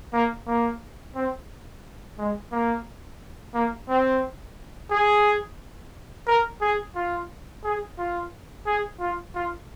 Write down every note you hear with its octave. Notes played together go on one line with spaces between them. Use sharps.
A#3
A#3
C4
G#3
A#3
A#3
C4
G#4
A#4
G#4
F4
G#4
F4
G#4
F4
F4